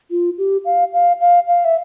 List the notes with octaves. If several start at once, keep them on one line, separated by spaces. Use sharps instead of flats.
F4
G4
F5
F5
F5
F5
E5